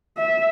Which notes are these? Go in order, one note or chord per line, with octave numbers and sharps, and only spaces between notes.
E5